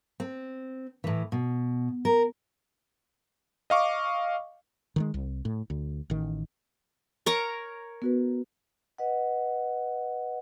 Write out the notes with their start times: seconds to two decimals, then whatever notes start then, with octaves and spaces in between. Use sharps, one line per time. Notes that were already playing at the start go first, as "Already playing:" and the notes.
0.20 C4
1.04 A2 E3
1.32 B2
2.05 A#4
3.70 D#5 F5 C#6 D6
4.96 D#3 E3 G#3
5.14 C2
5.45 A2
5.70 D2
6.10 A1 D#3
7.26 A#4 C#5 A#5
8.02 B3 F#4 B4
8.98 B4 D#5 F#5